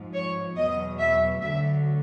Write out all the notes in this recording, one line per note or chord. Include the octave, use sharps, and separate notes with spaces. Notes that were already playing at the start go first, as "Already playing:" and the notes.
Already playing: G#2 F3
C#5
E2 B2 F#3 D#5
E5
D2 D3 F#3 E5